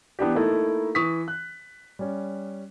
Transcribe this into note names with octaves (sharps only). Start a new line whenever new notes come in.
E3 B3 D4 G4
A3 A#3 D#4 E4 A4
E3 C#6 D#6 B6
F#6
G3 C#4